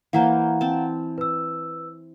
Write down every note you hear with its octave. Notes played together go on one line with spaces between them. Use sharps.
E3 A#3 C5 F5 F#5 A#5
C4 A5
B4 E6